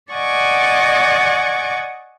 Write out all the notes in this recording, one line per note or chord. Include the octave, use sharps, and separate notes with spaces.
D5 D#5 F#5 G#5 C#6 D6